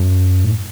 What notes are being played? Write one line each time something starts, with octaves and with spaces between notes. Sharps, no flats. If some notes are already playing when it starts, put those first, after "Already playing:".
Already playing: F#2
A2